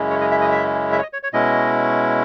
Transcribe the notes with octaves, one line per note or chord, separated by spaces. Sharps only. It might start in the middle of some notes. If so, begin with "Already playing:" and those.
Already playing: F#2 C#3 G#3 C#4 E4
C#5
D#5
E5
D#5
E5
E5
C#5
D#5
C#5
C#5
B2 G#3 C#4 E4 D#5